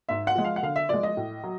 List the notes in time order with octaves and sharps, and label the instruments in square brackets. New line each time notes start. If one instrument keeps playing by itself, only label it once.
[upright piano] G#2 E5
F#5
F3 G#3
F5
F#5
D3 F5
E5
F3 G#3 D5
D#5
A2
F#3